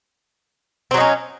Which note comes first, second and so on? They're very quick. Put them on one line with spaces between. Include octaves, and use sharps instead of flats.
C4 F#3 D#4 C#4